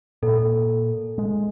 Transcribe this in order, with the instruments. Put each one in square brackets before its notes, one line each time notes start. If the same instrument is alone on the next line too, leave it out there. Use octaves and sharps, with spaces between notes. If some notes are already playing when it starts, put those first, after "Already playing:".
[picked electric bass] A#2 [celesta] A4
[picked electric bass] G#3